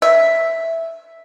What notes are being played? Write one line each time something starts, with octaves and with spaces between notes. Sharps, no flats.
E5